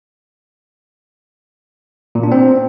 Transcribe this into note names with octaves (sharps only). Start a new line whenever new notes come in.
A#2
D4
C4